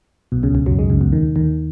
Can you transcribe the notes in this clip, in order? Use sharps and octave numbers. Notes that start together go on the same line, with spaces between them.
B1 B2
C#2 C#3
C#2 C#3
F#2 F#3
G#2 G#3
C#2 C#3
B1 B2
D#2 D#3
D#2 D#3